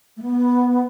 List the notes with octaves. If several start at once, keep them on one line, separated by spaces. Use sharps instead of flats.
A3
B3